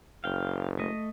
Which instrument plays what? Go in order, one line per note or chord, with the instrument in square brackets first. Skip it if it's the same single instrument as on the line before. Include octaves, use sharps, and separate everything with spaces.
[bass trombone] F#1 [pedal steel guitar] F5 G5
[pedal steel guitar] A3 D#5